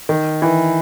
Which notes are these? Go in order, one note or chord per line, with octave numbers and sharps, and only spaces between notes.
D#3
E3